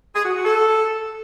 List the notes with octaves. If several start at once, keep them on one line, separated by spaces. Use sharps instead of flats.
G#4
F#4
F#4
A4